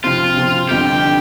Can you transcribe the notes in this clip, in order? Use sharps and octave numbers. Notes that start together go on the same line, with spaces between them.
C3 F3 C4 F4
C3 F3 C4
G1 F2 D3 G4
D3